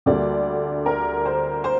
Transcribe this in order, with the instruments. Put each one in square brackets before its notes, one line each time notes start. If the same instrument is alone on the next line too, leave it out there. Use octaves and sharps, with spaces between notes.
[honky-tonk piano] D2 D3 G3 A#3 D5
A#4
C5
C5